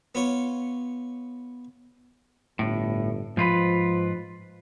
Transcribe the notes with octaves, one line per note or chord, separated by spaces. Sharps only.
B3 F4 C#5
G1 A2
G#2 F3 F4 B4